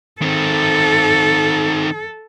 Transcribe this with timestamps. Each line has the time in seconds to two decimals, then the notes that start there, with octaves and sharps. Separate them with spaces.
0.22 D#3 C4 A4